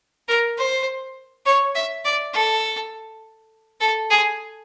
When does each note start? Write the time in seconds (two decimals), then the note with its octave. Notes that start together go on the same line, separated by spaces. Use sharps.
0.28 A#4
0.58 C5
1.46 C#5
1.75 E5
2.05 D5
2.33 A4
3.81 A4
4.10 G#4